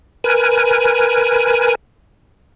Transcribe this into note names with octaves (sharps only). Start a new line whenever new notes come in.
A#4 B4 G#5